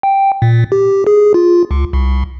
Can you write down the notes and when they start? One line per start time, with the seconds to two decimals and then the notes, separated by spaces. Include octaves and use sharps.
0.03 G5
0.42 A#2
0.72 G4
1.07 G#4
1.34 F4
1.71 C#2
1.93 C2